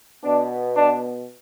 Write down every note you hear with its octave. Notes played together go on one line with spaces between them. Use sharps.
B2 B3 D4
D4